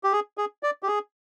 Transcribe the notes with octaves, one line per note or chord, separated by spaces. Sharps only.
G4
G#4
G#4
D5
G4
G#4